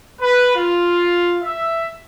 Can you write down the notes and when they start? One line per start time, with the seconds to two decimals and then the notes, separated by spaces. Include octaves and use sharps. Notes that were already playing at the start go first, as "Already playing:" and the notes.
0.21 B4
0.56 F4
1.43 E5